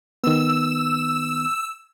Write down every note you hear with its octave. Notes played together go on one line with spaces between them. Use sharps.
D#3 B3 E6